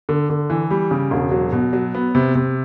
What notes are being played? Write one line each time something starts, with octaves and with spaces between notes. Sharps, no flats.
D3
D3
E3
G3
C#3
E1
F#3
B2
F#3
B3
C3
C3